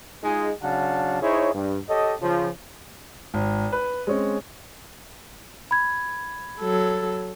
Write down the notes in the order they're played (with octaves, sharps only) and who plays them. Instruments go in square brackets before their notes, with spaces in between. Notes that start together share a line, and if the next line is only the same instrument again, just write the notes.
[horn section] G#3 D#4 F4 G#4
C#3 F#3 D4 F5 F#5 A5
D#4 E4 G#4 C5 C#5
G2
G4 A4 C#5 D#5
C#3 F3
[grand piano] G#1
B4
G#3 C4 C#4
[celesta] B5 G#6
[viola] F#3 A4